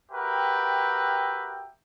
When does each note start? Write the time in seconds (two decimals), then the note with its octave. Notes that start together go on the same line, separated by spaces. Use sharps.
0.12 F#4 G4 A#4 B4 E5 G5